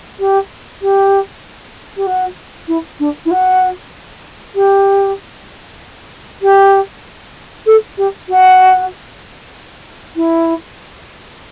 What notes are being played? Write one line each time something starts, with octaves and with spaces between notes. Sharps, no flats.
G4
G4
G4
F#4
E4
D4
E4
F#4
G4
G4
A4
G4
F#4
E4